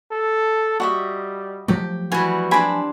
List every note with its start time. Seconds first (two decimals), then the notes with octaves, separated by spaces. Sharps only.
0.11 A4
0.80 G3 F#4 D#5 E5
1.68 F3 F#3 A3 G4
2.12 E3 G3 F#4 G#5
2.51 C4 D4 G#5 B5